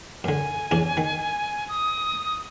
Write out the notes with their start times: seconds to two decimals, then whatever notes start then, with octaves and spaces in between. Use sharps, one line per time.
0.24 F#2 D3 G#5
0.71 E2 C#4 D4
0.97 D#3
1.69 D#6